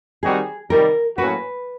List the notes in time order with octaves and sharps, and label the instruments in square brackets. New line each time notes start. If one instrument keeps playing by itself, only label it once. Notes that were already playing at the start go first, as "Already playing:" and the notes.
[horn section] D#3 G3 C4 D#4 F#4 [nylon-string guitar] G#4
[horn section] C3 D#3 G3 [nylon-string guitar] A#4
[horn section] A2 F#3 A#3 C#4 F#4 [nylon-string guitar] B4